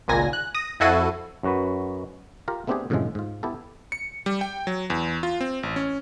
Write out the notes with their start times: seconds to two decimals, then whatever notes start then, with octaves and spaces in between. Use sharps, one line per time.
0.08 G#1 C#2 A#2 G#5 A#6
0.33 F#6
0.55 D#6 A#6
0.80 F2 E4 F#4 A4 C7 D#7
1.43 F#2 F#4 B4
2.48 F4 G4 A#4
2.67 A3 B3 C4 D4 G4 G#4
2.90 F#2 A2 C3 D#3 F3 G#3
3.15 G#2 F4
3.43 B3 E4 G4 A4
3.92 C#7
4.26 G3
4.41 G5
4.67 F#3
4.90 E2
5.23 F4
5.41 C4
5.63 A1
5.76 C#4